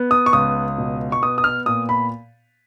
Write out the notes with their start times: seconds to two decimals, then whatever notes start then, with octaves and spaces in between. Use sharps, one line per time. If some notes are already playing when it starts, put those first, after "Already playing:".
Already playing: B3
0.11 D#6
0.26 C#6
0.33 C#2 D#6
0.78 B2
1.12 C#6
1.22 B3 D#6
1.38 D#6
1.44 F6
1.66 A#2 D#6
1.89 B5